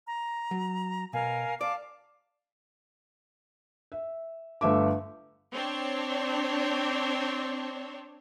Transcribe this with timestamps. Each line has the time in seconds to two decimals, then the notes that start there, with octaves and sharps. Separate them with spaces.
0.07 A#5
0.51 F#3
1.13 B2 A#4 F5 G#5
1.61 D5 F5 A5 D6
3.92 E5
4.61 G1 A3 E5 D6
5.54 C4 D4 C#5